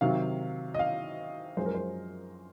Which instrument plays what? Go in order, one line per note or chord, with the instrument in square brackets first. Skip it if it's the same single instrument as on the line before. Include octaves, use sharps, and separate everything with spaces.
[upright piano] C3 D#3 F#3 F5
D#5
F5
F#2 F3 G#3 C5
A#4
C5